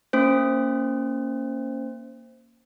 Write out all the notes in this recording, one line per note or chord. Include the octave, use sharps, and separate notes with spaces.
A#3 C#4 C5